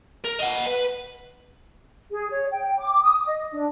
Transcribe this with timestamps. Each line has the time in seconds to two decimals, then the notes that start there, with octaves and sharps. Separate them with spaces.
0.25 A#4
0.40 D#5 F#5
0.67 B4
2.11 G#4
2.29 C#5
2.52 G5
2.79 D6
3.01 D#6
3.26 D#5
3.52 D4